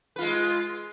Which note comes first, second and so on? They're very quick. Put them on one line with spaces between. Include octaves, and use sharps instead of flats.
B4 F4 G#3